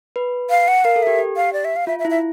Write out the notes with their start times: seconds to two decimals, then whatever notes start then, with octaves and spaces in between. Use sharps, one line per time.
0.16 B4
0.50 F5
0.68 F#5
0.85 A#4 F5
0.96 A4
1.02 G4 E5
1.19 G4
1.36 F5
1.53 D5
1.65 E5
1.76 F5
1.87 F4 E5
1.99 E5
2.05 E4
2.10 E5